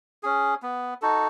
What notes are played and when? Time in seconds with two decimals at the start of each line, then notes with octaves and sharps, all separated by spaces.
0.23 C#4 G#4
0.62 B3
1.02 D#4 F#4 A4